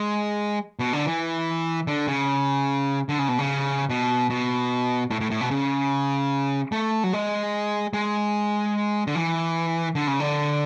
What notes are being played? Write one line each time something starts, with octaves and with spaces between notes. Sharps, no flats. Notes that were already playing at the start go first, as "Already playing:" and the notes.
Already playing: G#3
B2
D3
E3
D3
C#3
D3
C#3
B2
C#3
B2
B2
A2
A2
A2
B2
C#3
A3
F#3
G#3
G#3
D3
E3
D3
C#3
D3